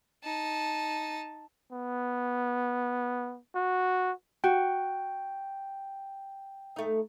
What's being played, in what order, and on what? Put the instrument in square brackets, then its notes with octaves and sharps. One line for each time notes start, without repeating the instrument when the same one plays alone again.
[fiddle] D#4 A5
[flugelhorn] B3
F#4
[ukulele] F#4 [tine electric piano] G5
[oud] A3 D#4